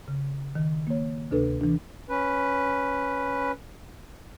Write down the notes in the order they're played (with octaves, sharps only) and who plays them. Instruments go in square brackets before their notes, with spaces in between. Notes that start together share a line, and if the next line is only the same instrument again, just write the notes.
[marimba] C#3
D#3
A#3 C#5
D2 C3 D4 A4 B4
E3 D4
[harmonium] C#4 B4